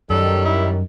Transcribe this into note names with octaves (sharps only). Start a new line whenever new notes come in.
F#2 D#3 F#3 G3 A4
E4